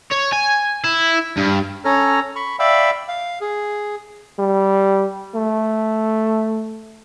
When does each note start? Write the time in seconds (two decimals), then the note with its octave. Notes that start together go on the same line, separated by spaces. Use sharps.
0.12 C#5
0.33 G#5
0.84 E4
1.37 G2
1.85 C#4 A4 C#5 A#5 F6
2.36 B5 C#6
2.59 D5 E5 F5 G5 B5 E6
3.08 F5
3.41 G#4
4.39 G3
5.35 A3